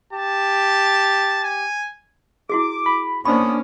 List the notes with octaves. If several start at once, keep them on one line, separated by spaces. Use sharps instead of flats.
G4 A5
G#5
E4 F#4 G#4 D6
B5
A#3 B3 C#4 D4 C5 B5 C#6 D#6